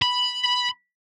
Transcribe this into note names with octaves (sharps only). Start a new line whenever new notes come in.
B5